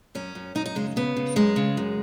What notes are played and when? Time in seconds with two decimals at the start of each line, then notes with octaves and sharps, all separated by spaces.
0.15 F#2 C#4
0.35 F#2
0.55 F#2 D#4
0.66 D#4
0.75 C#3 G#3
0.96 C#3 B3
1.17 C#3
1.36 F#2 G#3
1.56 C#3
1.77 F#2